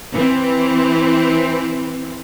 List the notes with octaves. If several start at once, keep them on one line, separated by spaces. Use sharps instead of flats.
E3 C4